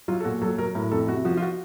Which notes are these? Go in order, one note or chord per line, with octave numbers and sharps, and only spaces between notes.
F#3 F4
A4
A#2 F#4
F#3 A4
F#3 A#4
A2 A#4
F2 A4
C3 F#4
F3 F#4
F4
F#4